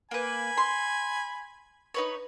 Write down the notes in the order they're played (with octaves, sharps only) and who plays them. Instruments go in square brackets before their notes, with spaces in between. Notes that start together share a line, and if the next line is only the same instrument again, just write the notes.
[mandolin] A#3 B4 [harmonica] G#5 B5
[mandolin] C6
D#4 B4 C#5